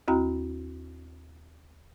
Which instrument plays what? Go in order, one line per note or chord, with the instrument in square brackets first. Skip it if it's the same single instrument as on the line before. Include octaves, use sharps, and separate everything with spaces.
[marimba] D#2 C4 E4 F#4 G5 A#5